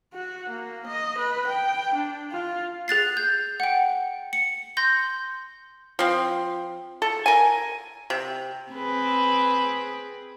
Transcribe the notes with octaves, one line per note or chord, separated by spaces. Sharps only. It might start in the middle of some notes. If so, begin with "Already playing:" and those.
F#4
A#3
D#5
B4
G5
D4
F4
G#4 F#6 A6 C7
G6
F#5 G5
C#7
C6 G6 A#6
F3 C4
A4
A#4 G#5
C3
C4 G#4 B4